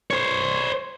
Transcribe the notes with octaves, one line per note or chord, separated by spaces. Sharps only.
C5 C#5